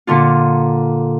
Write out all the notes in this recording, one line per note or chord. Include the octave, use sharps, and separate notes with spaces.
A#2 D3 F4